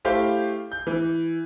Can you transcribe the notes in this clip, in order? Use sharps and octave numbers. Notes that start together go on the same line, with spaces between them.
A3 E4 G4 C5 F5 G6
G6
E3